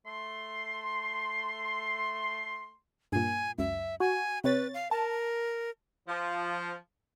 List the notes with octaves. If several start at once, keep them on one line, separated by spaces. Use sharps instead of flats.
A3 C6
G2 A#2 G#5
C#2 F#2 E5
F#4 G#5
C3 B4 C#5 A6
F5
A#4 A5
F3